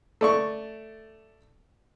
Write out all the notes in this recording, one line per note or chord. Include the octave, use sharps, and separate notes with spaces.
A3 D5 C#6